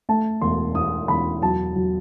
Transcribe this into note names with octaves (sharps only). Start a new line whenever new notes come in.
A3 A5
E1 C6
E2 D#6
E1 B5
F#3 A5
F#3